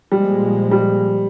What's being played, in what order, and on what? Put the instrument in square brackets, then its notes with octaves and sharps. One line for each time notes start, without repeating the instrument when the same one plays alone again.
[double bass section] A#2 F3 G#3 [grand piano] G3
[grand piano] G3